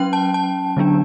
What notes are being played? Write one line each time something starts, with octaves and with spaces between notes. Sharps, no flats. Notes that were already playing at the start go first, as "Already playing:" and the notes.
Already playing: F#3 C#4 G5
A5
A5
D3 F#3 B3 D4